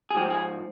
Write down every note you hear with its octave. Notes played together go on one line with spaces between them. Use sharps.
G#4
G#2 F3 G4
G#4